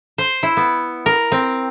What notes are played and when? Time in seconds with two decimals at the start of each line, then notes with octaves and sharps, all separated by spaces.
0.18 C5
0.43 E4
0.57 B3
1.06 A#4
1.32 C4